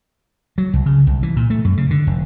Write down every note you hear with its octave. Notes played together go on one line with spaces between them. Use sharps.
F#3
C2
C#3
C2
E3
A#2
A3
F#2
C#3
D3
F1